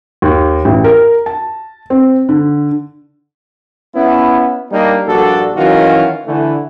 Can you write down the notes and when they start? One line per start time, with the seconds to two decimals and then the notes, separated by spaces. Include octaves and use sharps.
0.22 D#2
0.65 A1
0.84 A#4
1.26 A5
1.90 C4
2.29 D3
3.95 B3 C#4 E4
4.72 G3 A#3 D4 D#4
5.08 A#1 G3 D4 F#4 A4
5.56 D#3 E3 F#3 C#4 F4 F#4
6.27 D3 E3 A3